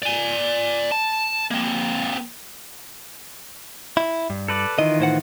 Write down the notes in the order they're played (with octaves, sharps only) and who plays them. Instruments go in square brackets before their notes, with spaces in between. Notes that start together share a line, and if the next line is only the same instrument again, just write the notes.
[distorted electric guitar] D5 G#5
A5
A#3 C4
[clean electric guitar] E4
G2
[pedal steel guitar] A4 B4 D5
[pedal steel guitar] D#3 E3 F4 [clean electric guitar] D#5
[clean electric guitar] A2 C5 F#5